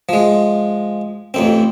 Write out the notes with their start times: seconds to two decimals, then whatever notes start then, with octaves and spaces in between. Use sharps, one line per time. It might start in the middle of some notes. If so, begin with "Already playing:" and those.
0.09 F3 G#3
1.34 A1 F2 C4